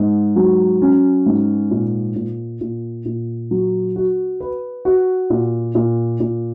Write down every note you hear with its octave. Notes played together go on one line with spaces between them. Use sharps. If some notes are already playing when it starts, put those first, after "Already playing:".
Already playing: G#2
F#3
C#4
G#2
A#2
A#2
A#2
A#2
F#3
F#4
B4
F#4
A#2
A#2
A#2